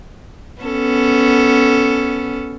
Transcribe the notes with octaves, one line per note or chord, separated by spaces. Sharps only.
B3 C#4 A4